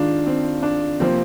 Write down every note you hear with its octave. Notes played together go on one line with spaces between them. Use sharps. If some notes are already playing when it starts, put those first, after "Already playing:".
Already playing: D#3 G#3 D4 F4
C4
D4
C3 F3 A#3 C4